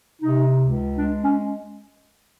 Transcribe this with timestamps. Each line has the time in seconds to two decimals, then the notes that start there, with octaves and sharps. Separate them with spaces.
0.22 C3 D#4
0.60 C#2
0.98 G#3 D4
1.23 C#4